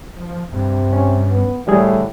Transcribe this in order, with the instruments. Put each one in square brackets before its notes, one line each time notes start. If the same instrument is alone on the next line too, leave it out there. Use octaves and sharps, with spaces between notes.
[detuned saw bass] F3
[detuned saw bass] G2 [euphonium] C3
[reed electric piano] C#4
[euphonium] B3
[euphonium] A2 [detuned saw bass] D3 [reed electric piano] E3 G3 G#4